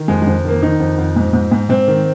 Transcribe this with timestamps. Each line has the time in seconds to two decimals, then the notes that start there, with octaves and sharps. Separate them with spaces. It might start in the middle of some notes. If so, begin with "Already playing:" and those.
Already playing: D#3
0.08 F2 G#3
0.22 F2 G#3
0.45 D#3 A#3
0.62 D#3 D#4
0.80 F2
0.98 F2
1.16 G#2
1.33 G#2
1.52 G#2
1.69 G#2 C4
1.88 D#3